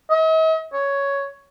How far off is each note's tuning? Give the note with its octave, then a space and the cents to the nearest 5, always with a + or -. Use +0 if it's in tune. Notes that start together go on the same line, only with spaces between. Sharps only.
D#5 +45
C#5 +5